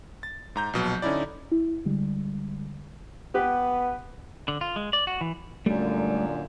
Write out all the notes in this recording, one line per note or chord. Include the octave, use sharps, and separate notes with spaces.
A6
G#2 A#5 G6
A#1 B2 F#3
D3 C#4 D#4 E4 D5
E4
D3 G3 G#3
B3 G4 B4
D3
F4
G#3
D5
F#4
E3
F#2 A#2 D3 G3 A3